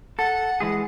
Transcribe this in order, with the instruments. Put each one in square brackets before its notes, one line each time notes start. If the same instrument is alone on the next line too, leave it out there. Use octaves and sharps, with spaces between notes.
[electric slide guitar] A4 [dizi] F#5
[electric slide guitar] E3 G#3 G#4